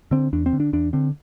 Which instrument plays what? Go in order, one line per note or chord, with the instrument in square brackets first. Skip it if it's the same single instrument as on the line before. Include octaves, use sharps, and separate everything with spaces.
[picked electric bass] D3 C4
E2 D4
C4
D3
D4
E2 D4
D3 C4